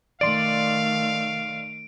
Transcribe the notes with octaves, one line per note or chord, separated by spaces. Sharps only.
D#3 A3 D5 F5 C6 D7